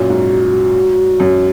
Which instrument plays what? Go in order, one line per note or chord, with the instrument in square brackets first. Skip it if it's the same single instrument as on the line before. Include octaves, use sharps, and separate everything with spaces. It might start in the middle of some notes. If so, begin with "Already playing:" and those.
Already playing: [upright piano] F#2 A#2 [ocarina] F#4
[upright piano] G#2
F#2